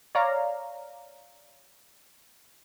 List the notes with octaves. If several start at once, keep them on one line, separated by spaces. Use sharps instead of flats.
C#5 D5 F5 A#5